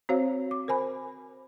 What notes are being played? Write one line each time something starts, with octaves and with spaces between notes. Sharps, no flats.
C4 F#4 C5 C#5 F5
D6
A#4 C5 G#5 B5